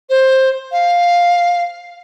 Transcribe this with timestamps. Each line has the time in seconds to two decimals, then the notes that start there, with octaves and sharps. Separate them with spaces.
0.09 C5
0.71 F5